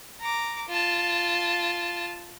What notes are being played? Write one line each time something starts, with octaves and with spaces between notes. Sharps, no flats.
A#5 D6
F4 A5